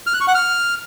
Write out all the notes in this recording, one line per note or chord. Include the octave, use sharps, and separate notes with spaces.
F6
F#6
C#6
F#5
F6